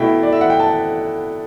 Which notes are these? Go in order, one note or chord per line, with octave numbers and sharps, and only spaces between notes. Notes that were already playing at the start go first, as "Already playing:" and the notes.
Already playing: B2 A3 E4 G5
D5
E5
F#5
G5
A5